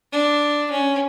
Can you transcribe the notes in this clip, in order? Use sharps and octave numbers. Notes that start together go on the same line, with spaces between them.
D4
C#4